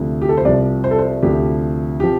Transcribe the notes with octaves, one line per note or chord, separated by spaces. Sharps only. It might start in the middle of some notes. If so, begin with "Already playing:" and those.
Already playing: D2 C3 F3
G4
A4
C5
C2 C3 F3 D5
C5
A4
C5
D2 C3 F3 G4
C3 F3 G4